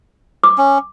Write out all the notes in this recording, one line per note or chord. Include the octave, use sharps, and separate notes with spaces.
D6
C#4